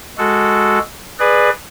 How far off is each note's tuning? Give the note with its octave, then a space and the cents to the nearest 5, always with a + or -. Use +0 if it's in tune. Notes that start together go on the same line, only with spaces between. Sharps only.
G#3 +0 F#4 +0 A4 +0
G#4 +0 B4 +0 D5 +25